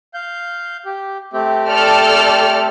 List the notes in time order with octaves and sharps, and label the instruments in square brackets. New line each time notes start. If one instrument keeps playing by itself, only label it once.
[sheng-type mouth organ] F5 G6
G4
A3 C4 G4
[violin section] A4 D5 F6